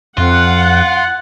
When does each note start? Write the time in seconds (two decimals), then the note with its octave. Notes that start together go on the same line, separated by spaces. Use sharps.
0.18 F2 F4 F#5